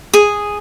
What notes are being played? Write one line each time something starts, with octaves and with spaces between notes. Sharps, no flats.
G#4